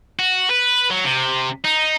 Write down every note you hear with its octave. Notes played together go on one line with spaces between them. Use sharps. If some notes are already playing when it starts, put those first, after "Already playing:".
F#4
B4
F#3
C3
D#4